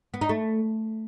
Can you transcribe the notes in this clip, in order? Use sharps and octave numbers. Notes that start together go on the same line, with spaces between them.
B3
D#4
A3